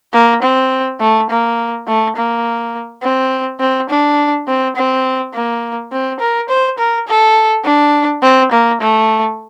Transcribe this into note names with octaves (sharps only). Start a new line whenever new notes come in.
A#3
C4
A3
A#3
A3
A#3
C4
C4
D4
C4
C4
A#3
C4
A#4
C5
A#4
A4
D4
C4
A#3
A3